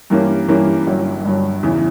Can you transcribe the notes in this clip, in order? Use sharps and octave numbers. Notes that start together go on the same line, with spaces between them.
G2 E3 A#3 C#4 G4
G2 E3 A#3 C#4 G4
G1 G2 F#3
G1 G2 F#3
E2 C#3 E3